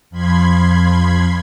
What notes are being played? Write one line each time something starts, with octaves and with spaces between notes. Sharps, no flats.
F2 F3 B5 C6 G#6